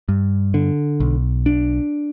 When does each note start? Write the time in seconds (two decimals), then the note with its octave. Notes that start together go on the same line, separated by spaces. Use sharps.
0.09 G2
0.54 D3
1.00 B1
1.46 D4